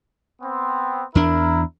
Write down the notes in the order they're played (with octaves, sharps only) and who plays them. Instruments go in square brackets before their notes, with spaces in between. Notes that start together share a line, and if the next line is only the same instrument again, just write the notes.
[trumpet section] B3 C4
[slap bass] E2 D4 [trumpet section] E4 A#4